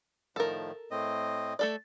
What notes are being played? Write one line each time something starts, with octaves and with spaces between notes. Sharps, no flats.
A2 D#3 F3 A4 A#4
A2 C4 D#5
A3 A4 D5